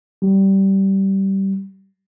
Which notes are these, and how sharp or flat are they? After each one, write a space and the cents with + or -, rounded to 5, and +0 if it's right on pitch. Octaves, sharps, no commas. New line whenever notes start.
G3 -20